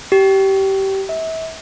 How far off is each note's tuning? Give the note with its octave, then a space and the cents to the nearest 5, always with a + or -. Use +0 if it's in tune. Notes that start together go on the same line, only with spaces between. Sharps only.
G4 -20
E5 -35